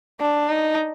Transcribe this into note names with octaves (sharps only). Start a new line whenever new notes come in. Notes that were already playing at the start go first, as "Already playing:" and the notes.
D4
D#4